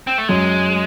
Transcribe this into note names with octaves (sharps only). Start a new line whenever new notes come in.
C4
A3
F#2 G#3